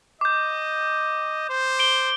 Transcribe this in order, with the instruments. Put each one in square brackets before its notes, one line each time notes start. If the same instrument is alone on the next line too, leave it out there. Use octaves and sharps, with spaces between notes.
[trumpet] D#5 [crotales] D6 G6
[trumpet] C5
[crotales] D7 G7